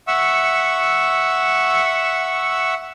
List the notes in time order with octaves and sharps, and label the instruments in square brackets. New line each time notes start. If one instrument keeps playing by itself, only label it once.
[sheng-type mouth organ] E5 F#5 C#6 E6